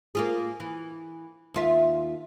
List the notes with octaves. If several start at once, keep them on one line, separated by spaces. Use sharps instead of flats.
A#3 F4 G#4
E3
D#2 F4 E5